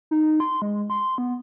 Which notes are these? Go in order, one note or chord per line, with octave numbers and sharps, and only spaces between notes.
D#4
C6
G#3
C6
B3